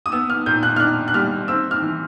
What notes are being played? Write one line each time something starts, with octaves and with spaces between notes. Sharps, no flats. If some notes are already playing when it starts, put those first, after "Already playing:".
D#6
B3 E6
F6
A#2 G6
F#6
F6
D4 F#6
F#6
G3 F6
C4 E6
F6
E3